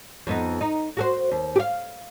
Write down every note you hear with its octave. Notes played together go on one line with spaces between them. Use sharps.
F2 B3 D#4
D#4
F#4 G#4 C5
D#2
G4 F5